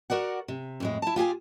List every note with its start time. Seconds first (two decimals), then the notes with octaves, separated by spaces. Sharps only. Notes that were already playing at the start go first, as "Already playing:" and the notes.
0.10 F#4 A#4 D5 F#5
0.48 C3
0.80 F2 A2 G#3
1.02 E4 A5
1.16 F4 G4 G#4 G#5